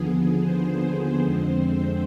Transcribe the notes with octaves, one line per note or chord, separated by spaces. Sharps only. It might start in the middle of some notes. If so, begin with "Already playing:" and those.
Already playing: D#2 D3 F3 B3 G#4
C5
F2 D3 G#3 C4 C5